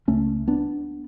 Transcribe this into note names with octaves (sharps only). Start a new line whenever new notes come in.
C#2 C#3 A3 C#4
B3 D4